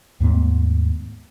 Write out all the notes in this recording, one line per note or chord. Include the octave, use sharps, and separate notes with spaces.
D#2 G#2 A3 B3